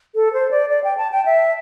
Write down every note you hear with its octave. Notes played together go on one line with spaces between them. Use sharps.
A4
C5
D5
D5
G5
A5
G5
E5